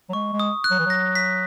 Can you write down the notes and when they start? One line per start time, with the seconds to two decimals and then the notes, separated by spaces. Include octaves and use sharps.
0.09 F#3
0.13 G#3 C#6
0.33 G#3
0.40 D#6
0.64 F#6
0.71 F#3
0.79 E3
0.86 F#3 A#6
1.15 B6